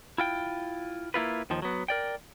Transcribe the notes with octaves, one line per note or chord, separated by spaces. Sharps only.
E4 F4 G5
A#3 E4 F4 B4
D#2 D#3 F3
F#3 B3
A#4 D5 G5